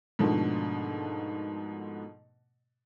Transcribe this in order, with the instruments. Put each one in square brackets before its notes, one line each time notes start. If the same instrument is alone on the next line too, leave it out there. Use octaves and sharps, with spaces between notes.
[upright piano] G#2 B2 D3 D#3 F3 A3